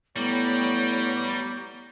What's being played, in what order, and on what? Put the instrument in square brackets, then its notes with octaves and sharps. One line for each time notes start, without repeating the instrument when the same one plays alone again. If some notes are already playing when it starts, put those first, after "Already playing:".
[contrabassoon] A2 [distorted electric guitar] G3 [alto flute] B3 [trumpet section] C#5 A#5 D6